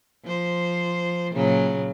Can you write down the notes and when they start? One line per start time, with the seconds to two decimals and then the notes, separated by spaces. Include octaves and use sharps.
0.24 F3 C5
1.32 A#2 C#3 F#3